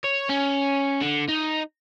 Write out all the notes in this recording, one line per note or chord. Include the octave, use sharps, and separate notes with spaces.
C#5
C#4
D3
D#4